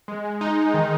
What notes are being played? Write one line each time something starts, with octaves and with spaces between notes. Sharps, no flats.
G#3
G#3
D#4
G#3
D#3